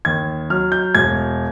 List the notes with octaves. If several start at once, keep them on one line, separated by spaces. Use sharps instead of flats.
D#2 G#6
F#3 F6
G6
E1 G#6